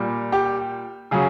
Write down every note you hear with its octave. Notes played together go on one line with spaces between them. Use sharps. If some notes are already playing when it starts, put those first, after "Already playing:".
Already playing: A#2 G3
G4
C#3 F#3 G#4